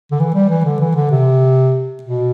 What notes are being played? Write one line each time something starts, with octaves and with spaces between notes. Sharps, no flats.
D3
E3
G3
E3
D3
E3
D3
C3
B2